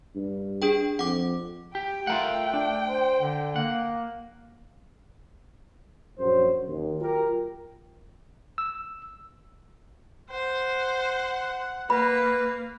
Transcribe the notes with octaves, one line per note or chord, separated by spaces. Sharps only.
G2
D4 G#4 G5
F2 F#5 D6
G4 G5
A3 F4 A#4 F#5
D4
C5
D3
A#3 F#5
A#1 F#2 F#3 C5
D#2
F#3 F4 G4 A#4
E6
C5 F#5
A#3 B4 B5